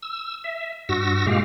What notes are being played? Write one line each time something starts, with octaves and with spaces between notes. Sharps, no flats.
E6
E5
G2 F#4 E6 A#6
A#2 G#3 G4 F5